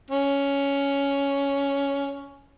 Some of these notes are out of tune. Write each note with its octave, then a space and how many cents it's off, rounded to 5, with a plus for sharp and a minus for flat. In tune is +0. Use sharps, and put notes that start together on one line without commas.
C#4 +10